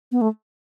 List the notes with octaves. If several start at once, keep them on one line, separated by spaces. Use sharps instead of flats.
B3
A3